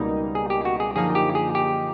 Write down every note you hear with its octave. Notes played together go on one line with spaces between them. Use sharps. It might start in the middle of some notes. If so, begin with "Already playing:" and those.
Already playing: C#2 B2 G3 A#3 D#4
G#4
G4
F#4
G#4
F#2 D3 F3 A#3 D#4 G#4
G4
G#4
G4